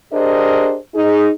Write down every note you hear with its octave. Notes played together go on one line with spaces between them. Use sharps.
D4 G4 G#4 A#4 C5 D#5
D#4 G#4